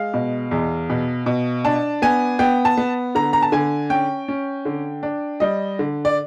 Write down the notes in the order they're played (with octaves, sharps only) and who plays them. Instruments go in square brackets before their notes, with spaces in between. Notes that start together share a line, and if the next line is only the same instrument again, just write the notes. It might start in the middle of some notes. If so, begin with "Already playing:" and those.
Already playing: [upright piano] G#3 F5
B2
E2
B2
B2
D4 A5
B3 G#5
B3 G5
A5
B3
D3 A#5
A#5
A5
D3 G#5
C#4 G5
C#4
D3
D4
G3 D#5
D3
D5